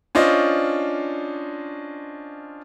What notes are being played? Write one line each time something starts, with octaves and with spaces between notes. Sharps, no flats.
C#4 D4 F4 C5 D#5